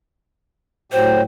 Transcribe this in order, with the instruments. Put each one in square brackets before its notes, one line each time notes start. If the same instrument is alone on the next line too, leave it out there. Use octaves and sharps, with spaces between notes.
[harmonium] A2 F#3 G4 [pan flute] C5